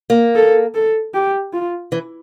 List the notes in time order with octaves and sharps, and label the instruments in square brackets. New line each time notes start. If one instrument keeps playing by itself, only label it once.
[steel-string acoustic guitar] A#3
[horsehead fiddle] A4
A4
G4
F4
[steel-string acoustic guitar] E3